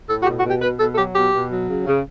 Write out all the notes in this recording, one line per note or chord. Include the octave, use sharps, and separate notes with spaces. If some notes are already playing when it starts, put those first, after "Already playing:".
A2 A4
F#4
B2 G4
F#4
B2
G4
B2 B4
B2 A4
A4
F#3 G4
B2 G4
B2
F#3
C#3
C#3